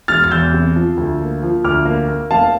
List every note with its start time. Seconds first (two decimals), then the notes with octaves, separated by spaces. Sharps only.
0.08 E1 F6 A6
0.24 A6
0.31 E2 E6 G6
0.53 C3
0.75 F3
0.97 D2
1.20 A#3
1.42 F3
1.64 D2 D6 F6
1.85 A#3
2.08 A#3
2.31 F1 F5 A5